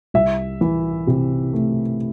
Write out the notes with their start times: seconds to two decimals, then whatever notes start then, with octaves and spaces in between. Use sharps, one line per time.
0.14 C2 E5
0.61 E3
1.07 C3
1.53 A3